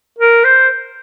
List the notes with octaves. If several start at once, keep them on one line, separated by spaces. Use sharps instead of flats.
A#4
C5